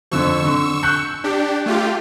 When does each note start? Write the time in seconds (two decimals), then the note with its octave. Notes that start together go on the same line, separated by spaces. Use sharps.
0.11 F2 D3 F3 C#6 E6
0.45 D3
0.83 F#6 G6 C#7
1.24 D4 G4
1.66 A3 F4 G4